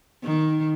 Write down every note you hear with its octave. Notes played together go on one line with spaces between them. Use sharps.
D#3